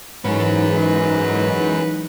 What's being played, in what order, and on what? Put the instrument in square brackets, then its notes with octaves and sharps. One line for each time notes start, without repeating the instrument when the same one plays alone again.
[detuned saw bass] G#2 [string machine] E3 G#3 D#4 [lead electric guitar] F#3 C#4 [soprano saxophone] B4